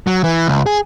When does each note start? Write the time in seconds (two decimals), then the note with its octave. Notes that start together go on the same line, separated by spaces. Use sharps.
0.07 F#3
0.24 E3
0.47 C#2
0.66 G#4